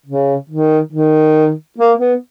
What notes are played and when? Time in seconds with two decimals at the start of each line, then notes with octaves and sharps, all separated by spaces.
0.06 C#3
0.50 D#3
0.92 D#3
1.78 A#3
1.99 B3